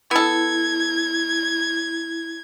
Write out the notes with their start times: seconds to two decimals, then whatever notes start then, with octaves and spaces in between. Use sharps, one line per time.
0.11 B3 E4 A4 G#6